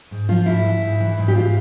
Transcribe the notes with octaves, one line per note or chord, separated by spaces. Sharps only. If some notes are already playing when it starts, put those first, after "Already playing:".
G#2
F3 F4
G#2 E4
E3
G#2
E3
G#2
G4
G#2 F4